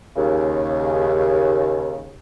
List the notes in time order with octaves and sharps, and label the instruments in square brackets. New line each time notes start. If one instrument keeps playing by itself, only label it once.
[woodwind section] D#2 C#3